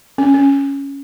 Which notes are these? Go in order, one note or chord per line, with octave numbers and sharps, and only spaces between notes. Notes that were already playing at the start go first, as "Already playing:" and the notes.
C#4
C#4